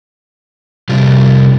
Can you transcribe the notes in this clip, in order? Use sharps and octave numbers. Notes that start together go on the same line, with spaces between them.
C3 G3 F4